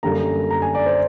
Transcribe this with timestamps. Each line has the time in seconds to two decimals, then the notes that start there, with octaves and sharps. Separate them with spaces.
0.03 F#2 D3 G3 A#3 A#5
0.50 A#5
0.62 G#5
0.75 D5
0.86 C5